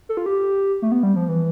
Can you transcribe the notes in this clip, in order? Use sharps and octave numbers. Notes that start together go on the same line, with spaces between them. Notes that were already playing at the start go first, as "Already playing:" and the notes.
A4
F4
G4
A3
B3
G3
F3
E3